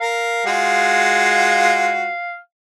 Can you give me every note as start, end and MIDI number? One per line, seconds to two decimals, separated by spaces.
0.01 0.44 70
0.01 2.38 77
0.46 2.10 56
0.46 2.10 65
0.46 2.10 66